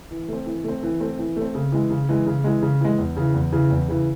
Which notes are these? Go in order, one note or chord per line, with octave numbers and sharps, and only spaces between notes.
E3
A3 C4
E3
A3 C4
E3
A3 C4
E3
A3 C4
C#3
E3 G#3
C#3
E3 G#3
C#3
E3 G#3
C#3
E3 G#3
E2
C#3 E3
E2
C#3 E3
E2
C#3 E3